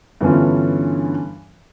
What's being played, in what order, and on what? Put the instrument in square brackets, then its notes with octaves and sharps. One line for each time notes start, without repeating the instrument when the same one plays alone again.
[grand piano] G2 D3 E3 B3 C#4 F4